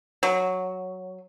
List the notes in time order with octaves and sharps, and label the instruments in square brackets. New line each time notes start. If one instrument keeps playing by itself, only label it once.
[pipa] F#3